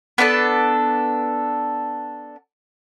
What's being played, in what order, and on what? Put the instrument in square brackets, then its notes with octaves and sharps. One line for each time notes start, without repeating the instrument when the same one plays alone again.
[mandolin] B3 D4 A4 A5